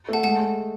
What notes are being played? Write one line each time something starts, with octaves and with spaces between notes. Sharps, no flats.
A3 F#5 A5
G#3 F#5 A5
G#3